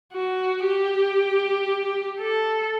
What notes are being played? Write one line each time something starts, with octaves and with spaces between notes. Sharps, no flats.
F#4
G4
A4